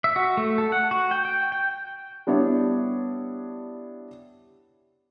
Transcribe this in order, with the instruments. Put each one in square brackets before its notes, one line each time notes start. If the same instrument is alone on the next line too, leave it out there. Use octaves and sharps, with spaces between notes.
[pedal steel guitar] E5
F#4
A3
A4
F#5
F#4
G5
G5
G5
[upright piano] G3 B3 D4 E4 C#5